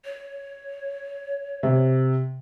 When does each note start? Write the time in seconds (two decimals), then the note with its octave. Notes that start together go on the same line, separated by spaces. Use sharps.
0.05 C#5
1.63 C3